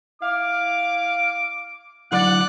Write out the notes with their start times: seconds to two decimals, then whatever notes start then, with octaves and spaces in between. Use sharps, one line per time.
0.22 E4 F5 D6
2.12 D3 F#3 E4 D5 F#5 F#6